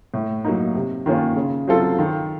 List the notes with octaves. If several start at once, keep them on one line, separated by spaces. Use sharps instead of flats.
A2
F#3 A#3 D#4
C3
D#3 A#3 C#4 F4
C#3
F#3 C4 F4 A4
D#3